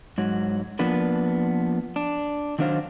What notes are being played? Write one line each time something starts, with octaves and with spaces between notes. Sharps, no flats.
G#2 F#3
F3 A#3 B3 D4 B4
D4
D#3 F#3 D4 C5 F5